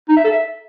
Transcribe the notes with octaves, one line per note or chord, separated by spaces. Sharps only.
D#4
E5
A4
E5